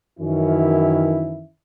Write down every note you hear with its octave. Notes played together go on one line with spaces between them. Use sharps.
F#2 D#3 E3 C#4 E4